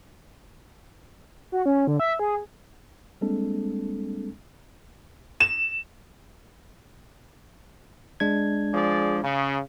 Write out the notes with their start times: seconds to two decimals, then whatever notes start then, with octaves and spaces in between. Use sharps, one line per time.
1.52 F#4
1.66 C#4
1.87 D3
2.00 E5
2.19 G#4
3.21 G3 G#3 A#3 C4 D4 A4
5.40 E7
8.20 G#3 D4 G#6
8.73 F3 G#4 D5
9.23 C#3